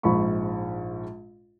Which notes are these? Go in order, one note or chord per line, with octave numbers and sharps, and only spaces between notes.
A#1 G#2 B5 C#6